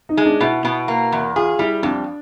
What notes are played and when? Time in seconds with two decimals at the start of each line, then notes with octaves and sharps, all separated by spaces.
0.09 D#4
0.18 G#3
0.26 D4
0.41 B2 E4
0.65 B2
0.88 A#3
1.12 E2
1.36 F4 G#4
1.59 G3 E4
1.83 F2 D4